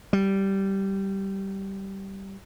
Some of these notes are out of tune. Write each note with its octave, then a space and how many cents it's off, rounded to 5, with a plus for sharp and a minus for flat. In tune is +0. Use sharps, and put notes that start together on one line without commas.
G3 -10